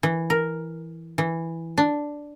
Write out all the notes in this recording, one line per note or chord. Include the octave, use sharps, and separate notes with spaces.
E3
A#4
E3
D4